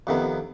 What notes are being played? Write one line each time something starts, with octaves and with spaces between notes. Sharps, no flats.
F2 C3 D#3 B3